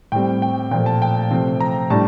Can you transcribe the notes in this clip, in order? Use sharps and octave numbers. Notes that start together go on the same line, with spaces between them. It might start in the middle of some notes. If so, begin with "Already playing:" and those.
A2 G3 C4 G5
G5
A#2 F3 A3 G5
A5
G5
C3 F3 A3 C4
A#5
A2 G3 D4 A5